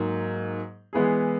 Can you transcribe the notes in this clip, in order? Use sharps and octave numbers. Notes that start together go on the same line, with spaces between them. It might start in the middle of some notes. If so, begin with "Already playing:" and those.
Already playing: G#2 F#3 A#3
E3 G#3 B3 E4 G#4